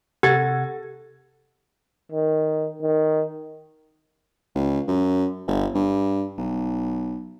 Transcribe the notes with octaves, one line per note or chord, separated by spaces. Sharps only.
C3 G4 A4 F#5 G#6 A6
D#3
D#3
C#2
F#2
G1
G2
B1